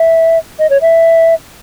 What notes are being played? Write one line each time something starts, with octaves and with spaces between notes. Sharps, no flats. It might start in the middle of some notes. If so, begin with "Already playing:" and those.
Already playing: E5
D#5
C#5
E5